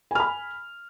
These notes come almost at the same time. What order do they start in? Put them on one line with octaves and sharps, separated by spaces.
G#5 F6 B5